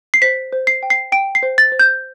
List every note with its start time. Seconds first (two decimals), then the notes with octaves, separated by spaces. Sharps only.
0.14 C7
0.22 C5 B6
0.53 C5
0.67 C7
0.83 G5
0.90 C7
1.12 G5 D7
1.35 C7
1.43 C5
1.58 A6
1.72 C5
1.79 G6